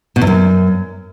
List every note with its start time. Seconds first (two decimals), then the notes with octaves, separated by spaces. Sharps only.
0.16 B2
0.21 E2
0.27 F#2